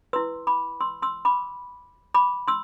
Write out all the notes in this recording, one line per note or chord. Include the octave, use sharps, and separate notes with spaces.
E4 B4 C6 E6
B5 D6
C6 E6
C6 E6
B5 D6
B5 D6
C6 E6